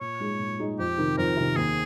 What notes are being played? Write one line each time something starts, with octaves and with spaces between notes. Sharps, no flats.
A#2 C#5
G#3 D#4 G#4
A#2
G#3 D#4 G#4
F2 G4
C3 D#3
F2 A#4
C3 D#3
D#2 G#4